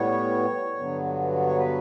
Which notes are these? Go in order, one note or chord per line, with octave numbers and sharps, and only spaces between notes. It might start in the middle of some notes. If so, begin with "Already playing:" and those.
Already playing: A2 G3 B3 C#5
G2 D3 F#3 B3
C#5
B4